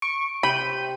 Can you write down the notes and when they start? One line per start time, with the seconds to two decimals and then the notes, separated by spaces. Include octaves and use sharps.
0.02 C#6 D7
0.43 C3 B5 G6 D#7